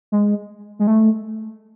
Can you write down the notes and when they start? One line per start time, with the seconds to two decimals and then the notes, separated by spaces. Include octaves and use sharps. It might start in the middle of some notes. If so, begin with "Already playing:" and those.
0.12 G#3
0.79 G#3
0.87 A3